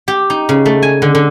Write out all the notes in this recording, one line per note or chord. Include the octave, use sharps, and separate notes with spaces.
G4
D#4
C#3
A3
G#5
D3
D3